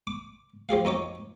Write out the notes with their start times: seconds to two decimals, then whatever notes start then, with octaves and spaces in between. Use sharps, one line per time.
0.07 D6
0.69 F3 G4 G#4 F5
0.85 F2 D#4 C#5 D6